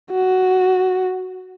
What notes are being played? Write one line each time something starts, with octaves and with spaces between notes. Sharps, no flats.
F#4